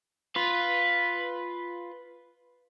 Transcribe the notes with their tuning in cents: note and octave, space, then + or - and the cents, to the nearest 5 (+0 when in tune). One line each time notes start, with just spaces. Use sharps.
F4 +0 B4 +0